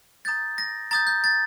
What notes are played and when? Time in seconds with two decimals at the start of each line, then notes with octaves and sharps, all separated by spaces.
0.25 A#5 D#6 G6 A6
0.58 A#6
0.91 A#5 D#6 G6 A6
1.07 G6
1.24 A6